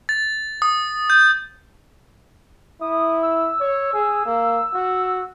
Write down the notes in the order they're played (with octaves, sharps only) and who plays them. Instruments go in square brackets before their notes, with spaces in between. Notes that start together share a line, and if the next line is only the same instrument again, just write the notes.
[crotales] A6
D#6
G6
[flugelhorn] E4 [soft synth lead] D#6
[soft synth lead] E6
[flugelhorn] C#5
G#4
A#3
F#4